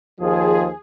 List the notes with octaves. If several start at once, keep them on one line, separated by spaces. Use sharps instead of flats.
D#2 F3 G#4